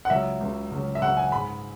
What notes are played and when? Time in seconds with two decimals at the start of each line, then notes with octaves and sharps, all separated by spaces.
0.05 F#5
0.10 C#2 C#3 F#3 E5
0.41 C#2 C#3 F#3
0.71 C#2 C#3 F#3
0.95 E5
1.01 C#2 C#3 F#3 F#5
1.17 G#5
1.32 G#2 G#3 B5